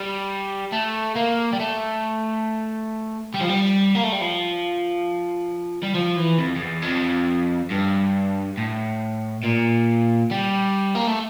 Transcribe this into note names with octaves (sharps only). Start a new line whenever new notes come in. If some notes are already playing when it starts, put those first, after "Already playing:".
Already playing: G3
A3
A#3
G3
A3
G3
F3
G3
A#3
A3
G3
F3
G3
F3
E3
F2
F2
E2
F2
G2
A2
A#2
G3
A#3
A3